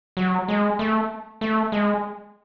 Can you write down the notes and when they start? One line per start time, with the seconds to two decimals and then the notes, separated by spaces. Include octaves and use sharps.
0.17 F#3
0.48 G#3
0.79 A3
1.41 A3
1.72 G#3